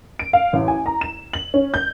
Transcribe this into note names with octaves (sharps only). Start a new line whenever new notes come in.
D7
F5
A1
G#5
A#5
E7
F#7
C#4
G6